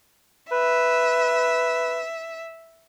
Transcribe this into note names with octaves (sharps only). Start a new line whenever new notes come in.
B4 E5